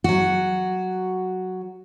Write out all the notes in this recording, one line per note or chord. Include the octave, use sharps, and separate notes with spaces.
F#3 F#4